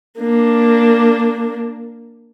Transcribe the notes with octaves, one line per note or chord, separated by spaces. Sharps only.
A#3 D4